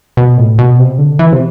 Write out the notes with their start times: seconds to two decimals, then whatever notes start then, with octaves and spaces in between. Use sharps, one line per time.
0.17 B2
0.38 A2
0.59 B2
0.79 C3
0.98 D3
1.19 E3
1.32 C3